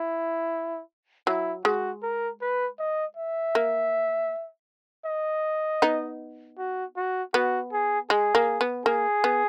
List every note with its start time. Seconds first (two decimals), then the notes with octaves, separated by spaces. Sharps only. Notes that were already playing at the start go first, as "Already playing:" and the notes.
Already playing: E4
1.27 F#3 E4
1.65 G#3 F#4
2.03 A#4
2.42 B4
2.79 D#5
3.17 E5
3.55 A#3
5.06 D#5
5.82 B3 D#4
6.58 F#4
6.96 F#4
7.33 B3 F#4
7.72 G#4
8.10 G#3 G#4
8.35 A#3
8.61 B3
8.86 A#3 G#4
9.24 B3